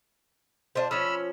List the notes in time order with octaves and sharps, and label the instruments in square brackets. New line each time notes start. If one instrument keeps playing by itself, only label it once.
[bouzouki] D4 F4 C5
[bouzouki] F3 C#4 [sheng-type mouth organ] B5 E6 F6